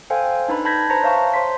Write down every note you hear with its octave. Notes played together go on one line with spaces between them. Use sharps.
A4 C5 F5 G5 G#5
D4 D#4 B4 B5
A5 B5 G6 G#6 A#6 B6
B4 C5 A5 A#5 A#6
C#5 E5 F5 A5 C#6
C5 C#5 C6 B6